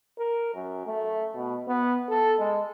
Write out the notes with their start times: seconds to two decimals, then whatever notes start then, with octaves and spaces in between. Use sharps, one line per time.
0.18 A#4
0.54 F#2
0.86 A3
1.35 B2
1.68 B3
2.09 A4
2.40 G#3